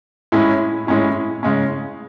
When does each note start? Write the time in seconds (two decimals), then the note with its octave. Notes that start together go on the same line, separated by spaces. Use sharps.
0.32 A2 G#3 C#4 E4
0.87 A2 G#3 C#4 E4
1.43 C#3 G#3 C#4